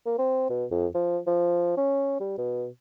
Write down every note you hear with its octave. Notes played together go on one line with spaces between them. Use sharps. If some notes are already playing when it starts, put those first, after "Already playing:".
A#3
C4
B2
F2
F3
F3
C#4
G3
B2